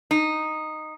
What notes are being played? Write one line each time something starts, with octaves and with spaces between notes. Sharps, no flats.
D#4